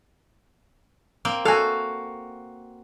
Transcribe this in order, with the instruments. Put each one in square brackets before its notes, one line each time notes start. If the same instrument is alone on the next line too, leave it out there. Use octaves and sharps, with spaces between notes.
[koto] A#3 C4
[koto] F#4 F5 [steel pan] A4 G#5